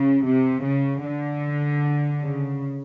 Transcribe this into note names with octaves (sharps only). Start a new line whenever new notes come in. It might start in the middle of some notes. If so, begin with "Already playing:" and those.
Already playing: C#3
C3
C#3
D3
C#3